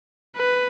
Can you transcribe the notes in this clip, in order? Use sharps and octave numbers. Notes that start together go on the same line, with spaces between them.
B4